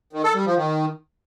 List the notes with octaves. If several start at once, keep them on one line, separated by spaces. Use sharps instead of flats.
D#3
A4
G3
F3
D#3